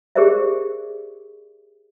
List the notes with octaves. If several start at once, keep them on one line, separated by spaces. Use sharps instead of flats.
G4 G#4 A#4 C5 D5 E5